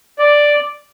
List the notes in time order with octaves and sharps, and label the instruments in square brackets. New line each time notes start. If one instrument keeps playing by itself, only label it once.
[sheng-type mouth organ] D5